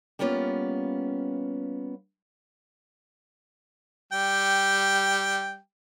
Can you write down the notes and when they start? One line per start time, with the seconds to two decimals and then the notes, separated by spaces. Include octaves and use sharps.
0.19 G3 A#3 B3 C#4 F4
4.12 G3 G5